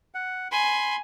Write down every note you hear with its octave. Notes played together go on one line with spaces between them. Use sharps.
F#5
G#5 B5 C6